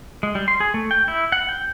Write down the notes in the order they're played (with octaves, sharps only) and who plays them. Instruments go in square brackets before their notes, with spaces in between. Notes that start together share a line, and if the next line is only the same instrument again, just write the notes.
[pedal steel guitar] G#3
G3
C6
G#4
A3
G5
E4
F#5
G5